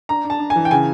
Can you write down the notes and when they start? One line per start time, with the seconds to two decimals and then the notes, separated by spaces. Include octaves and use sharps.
0.09 D4 A#5
0.24 D4
0.30 A5
0.40 D4
0.50 G#5
0.56 E3
0.65 G5
0.71 C#3 G#5